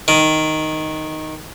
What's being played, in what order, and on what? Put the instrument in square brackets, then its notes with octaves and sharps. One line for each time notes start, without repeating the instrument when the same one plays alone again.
[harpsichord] D#3